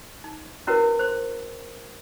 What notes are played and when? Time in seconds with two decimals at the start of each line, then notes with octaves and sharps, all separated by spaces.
0.24 D#4
0.67 C#4 E4 F#4 A#4 B4 C#5
0.99 C5 C6